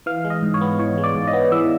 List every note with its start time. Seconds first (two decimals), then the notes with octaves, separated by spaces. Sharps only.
0.06 E3 F5
0.25 G#3
0.30 D#5
0.43 G#2
0.54 C#5
0.61 B3
0.79 E3 C#5
0.98 G#3
1.04 D5
1.15 G#2
1.27 D#5
1.33 B3
1.52 E3 E5